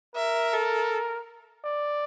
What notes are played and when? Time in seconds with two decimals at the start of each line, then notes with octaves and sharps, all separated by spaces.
0.15 A#4 E5
0.53 A4
1.64 D5